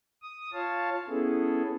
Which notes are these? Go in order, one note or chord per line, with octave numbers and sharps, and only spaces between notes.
D#6
F4 C#5 F5 A5
B3 C#4 E4 G#4 A4